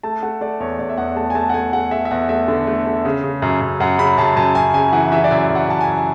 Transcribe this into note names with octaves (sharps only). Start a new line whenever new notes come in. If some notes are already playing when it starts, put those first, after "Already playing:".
A3 A5
A3 F#5
A3 D5
E2 C#5
E2 D5
E5
E2 F#5
A3 A5
G#5
A3 A5
F#5
A3 G#5
A3 F#5
A3 E5
E5
E2 F#5
A3 E5
D3
A3
A3
C#3
C#3
F#2
F#2
F#2 F#5
C#3 B5
F#2 A5
F#2 A5
F#2 G#5
C#3 G#5
E3 F#5
E3 E5
D5
F#2 E5
F#2
F#5
F#2 A5
G#5
F#2